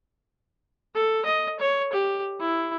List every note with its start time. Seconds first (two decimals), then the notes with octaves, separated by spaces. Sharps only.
0.95 A4
1.26 D#5
1.60 C#5
1.93 G4
2.40 E4